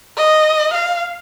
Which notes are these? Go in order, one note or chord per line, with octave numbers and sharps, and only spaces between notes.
D#5
F5